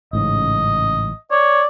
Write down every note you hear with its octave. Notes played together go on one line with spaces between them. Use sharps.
A1 G#2 C#3 D#5
C#5 D5